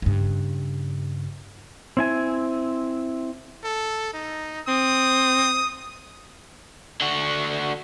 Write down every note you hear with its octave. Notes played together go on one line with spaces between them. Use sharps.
G2 C#3
C4 E4 G#5
A4
D#4
C4 D#6
D3 F#4